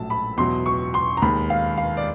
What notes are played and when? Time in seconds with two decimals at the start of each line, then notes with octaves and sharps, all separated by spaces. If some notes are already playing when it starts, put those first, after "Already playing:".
Already playing: A#1 A2 F#3 A3 A5
0.10 B5
0.37 E2 B2 F#3 C6
0.66 C#6
0.94 C6
1.17 A#5
1.22 D#2 D#3 G#3 B5
1.50 F5
1.77 F5
1.97 D5